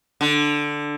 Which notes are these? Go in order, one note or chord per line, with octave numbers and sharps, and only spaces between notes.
D3